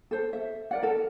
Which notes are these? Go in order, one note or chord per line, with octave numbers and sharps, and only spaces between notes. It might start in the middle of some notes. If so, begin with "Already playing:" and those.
A4 C5
E5
A#4 D5 F#5
A4 A#4